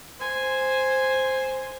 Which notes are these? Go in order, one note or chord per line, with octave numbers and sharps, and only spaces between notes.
C5 G#5